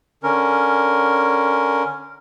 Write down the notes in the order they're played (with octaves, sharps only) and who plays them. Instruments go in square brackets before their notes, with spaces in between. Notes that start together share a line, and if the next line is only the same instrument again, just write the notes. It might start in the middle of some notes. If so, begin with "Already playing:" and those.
[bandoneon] D3 C#4 A#4